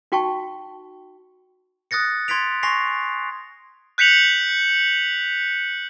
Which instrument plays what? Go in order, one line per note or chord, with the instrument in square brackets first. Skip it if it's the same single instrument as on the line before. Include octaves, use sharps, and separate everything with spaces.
[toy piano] D#4 F#4 G5 A5 C#6
[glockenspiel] D#6 F#6 A6 A#6 C#7
C6 G#6 A6 B6 D7 F7
G#5 C6 C#6 A#6 C7 F7
[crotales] F#6 G6 B6 C#7 F7 F#7